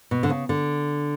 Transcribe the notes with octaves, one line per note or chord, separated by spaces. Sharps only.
B2
D3
C#3
D3